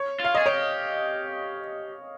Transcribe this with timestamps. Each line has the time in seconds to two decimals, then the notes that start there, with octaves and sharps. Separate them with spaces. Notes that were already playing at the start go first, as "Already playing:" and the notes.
Already playing: C#5
0.20 F4 F5
0.35 G#4 D#5
0.46 G4 C#5